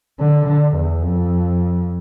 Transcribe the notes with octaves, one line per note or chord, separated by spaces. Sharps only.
D3
D3
E2
F2